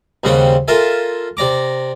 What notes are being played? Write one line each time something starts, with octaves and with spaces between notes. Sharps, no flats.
D#2 C#3 G3 C4 F#5
F4 A4 A#4 E5 G#5
C3 D5 A#5 D6